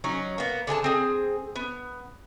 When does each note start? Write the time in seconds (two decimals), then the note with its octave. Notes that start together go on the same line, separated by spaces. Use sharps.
0.04 F#3 C#4 D#4
0.38 A#3 B3
0.67 D3 G#4 G5 A5
0.84 C4 G#4
1.56 B3